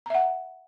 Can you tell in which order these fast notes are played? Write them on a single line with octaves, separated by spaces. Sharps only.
A#5 E5 F#5